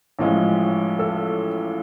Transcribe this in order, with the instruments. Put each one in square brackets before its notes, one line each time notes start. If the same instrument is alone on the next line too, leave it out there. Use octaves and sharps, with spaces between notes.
[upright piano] A1 A2 F3 G#3
A4